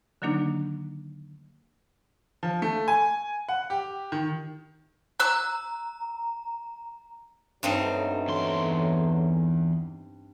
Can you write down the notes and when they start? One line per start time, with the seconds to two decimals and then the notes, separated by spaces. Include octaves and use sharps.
0.22 D3 D#3 F#3 A#3 D4 D#4
2.43 F3
2.62 A3
2.88 G#5
3.49 F#5
3.70 G4
4.12 D#3
5.20 A#5 E6 F#6
7.63 B1 G2 F#3 A3 C4 D#4
8.28 E2 C6